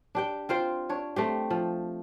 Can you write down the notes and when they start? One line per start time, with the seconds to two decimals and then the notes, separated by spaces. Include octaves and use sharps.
0.15 D4 G4 G5
0.49 C4 F4 C5 G5
0.89 D4 C#5
1.16 A3 C4 G4
1.50 F3